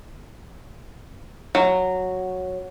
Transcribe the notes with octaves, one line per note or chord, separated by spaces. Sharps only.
F#3